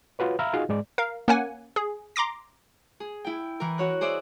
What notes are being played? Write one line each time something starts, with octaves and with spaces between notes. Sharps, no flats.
F4 F#4 B4 C#5
E5 F5 A#5 B5 E6 F6
D#4 F4 F#4 G#4 D#5 F5
G#2 G#3 D5
A#4 F5
A#3 C#4 F#5 G#5
G#4
A#5 C6 D6 A#6
G#4
E4 G5
E3 A#4
F#4 C#5 F#6
G#4 C5 D5 E5